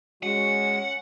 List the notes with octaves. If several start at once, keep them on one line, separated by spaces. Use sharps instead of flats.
G#3 C#4 F#4 F#5